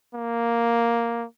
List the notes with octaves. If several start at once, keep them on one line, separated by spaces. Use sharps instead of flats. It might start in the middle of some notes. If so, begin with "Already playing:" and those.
A#3